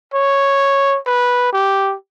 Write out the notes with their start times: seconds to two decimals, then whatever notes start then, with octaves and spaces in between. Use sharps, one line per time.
0.14 C#5
1.07 B4
1.53 G4